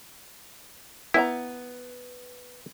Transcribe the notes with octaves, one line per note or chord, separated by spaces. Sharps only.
B3 E4 G#5 A#5